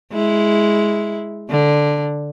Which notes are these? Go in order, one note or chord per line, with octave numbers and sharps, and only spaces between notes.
G#3 E4
D3